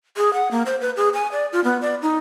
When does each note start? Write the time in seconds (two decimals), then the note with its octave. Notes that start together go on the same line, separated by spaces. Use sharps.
0.17 G#4
0.34 F#5
0.51 A#3
0.66 C5
0.81 B4
0.97 G#4
1.14 G#5
1.32 D5
1.53 F4
1.64 B3
1.82 D5
2.02 D#4